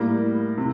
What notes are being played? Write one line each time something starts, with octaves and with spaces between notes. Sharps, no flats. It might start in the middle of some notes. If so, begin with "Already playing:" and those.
Already playing: A2 G3 A#3
C3